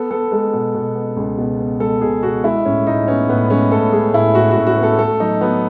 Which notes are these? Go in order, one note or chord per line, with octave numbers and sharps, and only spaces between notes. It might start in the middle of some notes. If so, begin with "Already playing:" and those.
Already playing: B3 A4
B3 A4
G#3 A4
B2
B2
B3
C#2
B2
B3
G#3 A4
B2 G#4
B2 F#4
G#3 E4
A2 C#4
A2 D#4
B3 C#4
A2 B3
G#3 C#4
A2 A4
G#3 G#4
A2 E4
A2 F#4
F#4
A2
F#4
B3
A4
A3 A4
F#3 D#4
F#3 B3